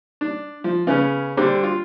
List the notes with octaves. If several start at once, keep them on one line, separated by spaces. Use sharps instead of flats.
D4
F3
C#3 B3 C#4
D3 G3 C4 D4
F4